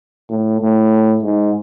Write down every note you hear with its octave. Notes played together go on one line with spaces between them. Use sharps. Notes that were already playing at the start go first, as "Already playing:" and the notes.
A2
A2
G#2